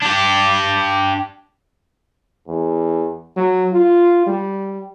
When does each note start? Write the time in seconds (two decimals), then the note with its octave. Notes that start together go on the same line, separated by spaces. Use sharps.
0.02 D4 G4
2.48 E2
3.37 F#3
3.72 F4
4.26 G3